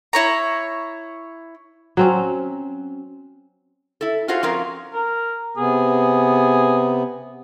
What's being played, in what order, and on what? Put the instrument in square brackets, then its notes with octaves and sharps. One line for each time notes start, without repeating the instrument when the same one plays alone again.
[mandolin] E4 C#5 A#5
[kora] F#3 C4 C#4
[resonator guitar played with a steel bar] E4 A4
F4 F#4 G#4 A4 C5 F5
F3 C4 C#4 F4 A#4 F5
[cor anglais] A#4
[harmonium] C3 B3 [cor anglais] G#4